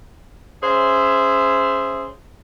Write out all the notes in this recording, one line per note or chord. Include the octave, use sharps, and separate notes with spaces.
C#4 G#4 C5 E5